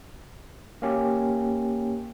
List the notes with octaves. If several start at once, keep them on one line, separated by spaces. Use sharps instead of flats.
A#3 C#4 G4